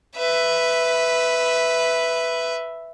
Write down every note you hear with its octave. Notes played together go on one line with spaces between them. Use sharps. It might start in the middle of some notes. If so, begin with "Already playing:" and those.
B4 E5